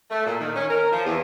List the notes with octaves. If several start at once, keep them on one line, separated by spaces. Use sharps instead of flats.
A3
A#2
D#3
C#4
A#4
F3
E2